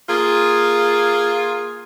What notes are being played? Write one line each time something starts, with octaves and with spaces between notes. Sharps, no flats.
A#3 F4 G#4